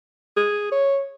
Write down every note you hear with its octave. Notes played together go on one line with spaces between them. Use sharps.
G#4
C#5